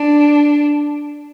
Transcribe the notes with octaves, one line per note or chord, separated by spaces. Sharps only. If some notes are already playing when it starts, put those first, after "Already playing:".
Already playing: D4